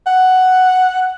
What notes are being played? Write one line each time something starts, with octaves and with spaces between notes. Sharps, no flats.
F#5